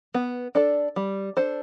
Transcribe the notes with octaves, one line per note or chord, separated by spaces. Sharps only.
B3
D4 A4 D5
G3
D4 A4 C5